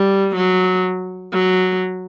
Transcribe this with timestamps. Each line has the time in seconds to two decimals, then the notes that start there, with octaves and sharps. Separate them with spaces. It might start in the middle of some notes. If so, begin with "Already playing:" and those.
Already playing: G3
0.36 F#3
1.33 F#3